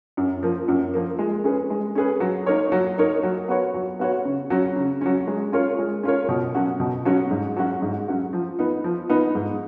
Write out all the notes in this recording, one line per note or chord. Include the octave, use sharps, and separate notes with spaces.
F#2
F3 A#3
F#2
F3 A#3
G#3
C#4 G#4 B4
G#3
C#4 G#4 B4
F#3
A#3 D#4 A#4 C#5
F#3
A#3 D#4 A#4 C#5
F#3
B3 F#4 C#5
F#3
B3 F#4 C#5
C#3
F#3 C#4
C#3
F#3 C#4
G#3
C#4 F4 A#4 C#5
G#3
C#4 F4 A#4 C#5
B2
F#3 C#4 F#4
B2
F#3 C#4 F#4
G#2
F#3 C#4 F#4
G#2
F#3 C#4 F#4
F3
B3 D#4
F3
B3 D#4
G#2